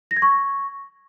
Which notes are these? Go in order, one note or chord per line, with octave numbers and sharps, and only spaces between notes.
A#6
G#6
C#6